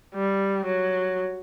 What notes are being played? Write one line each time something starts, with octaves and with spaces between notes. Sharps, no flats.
G3
F#3